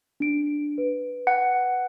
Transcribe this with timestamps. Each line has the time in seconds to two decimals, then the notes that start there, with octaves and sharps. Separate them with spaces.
0.20 D4 D7
0.78 B4
1.27 F#5